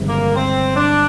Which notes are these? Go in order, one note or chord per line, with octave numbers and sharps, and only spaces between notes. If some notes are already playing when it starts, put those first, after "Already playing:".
Already playing: G1 F2 C3 D#3 G#3
A#3
C4
D4